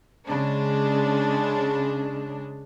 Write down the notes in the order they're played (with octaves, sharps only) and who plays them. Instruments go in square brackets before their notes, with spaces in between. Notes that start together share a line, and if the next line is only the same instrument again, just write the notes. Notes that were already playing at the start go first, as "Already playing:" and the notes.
[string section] C#3 G#3 D4